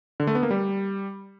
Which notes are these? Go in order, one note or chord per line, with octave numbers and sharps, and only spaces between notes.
D3
A3
B3
A#3
G3